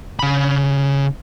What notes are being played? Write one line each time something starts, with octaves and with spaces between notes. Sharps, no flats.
C#3 B5